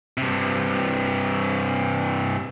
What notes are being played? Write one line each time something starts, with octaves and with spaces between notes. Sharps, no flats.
G2 C3